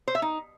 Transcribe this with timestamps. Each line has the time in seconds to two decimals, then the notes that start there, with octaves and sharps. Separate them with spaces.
0.08 C5
0.15 E5
0.22 D#4